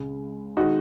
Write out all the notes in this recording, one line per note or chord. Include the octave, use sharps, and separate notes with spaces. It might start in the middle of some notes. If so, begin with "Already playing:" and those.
Already playing: C#2 C#3 G#3
D#3 G#3 D#4 F#4